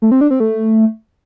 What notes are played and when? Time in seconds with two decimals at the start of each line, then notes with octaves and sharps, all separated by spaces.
0.02 A3
0.11 C4
0.21 D4
0.31 C4
0.40 A3